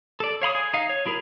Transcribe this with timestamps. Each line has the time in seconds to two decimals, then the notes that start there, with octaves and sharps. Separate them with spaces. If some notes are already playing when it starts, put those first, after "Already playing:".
0.20 A4 D5
0.42 C#5 F5 B5 D#6
0.55 G#4
0.74 D#4 F5
0.89 C#5
1.06 F#3 E4 G#4 A#4